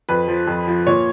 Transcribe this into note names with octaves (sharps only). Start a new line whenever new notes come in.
F2 B4
F3
F2
F3
A#2 C#5